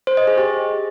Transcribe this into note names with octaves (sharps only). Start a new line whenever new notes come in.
C5
D#5
G#4
G4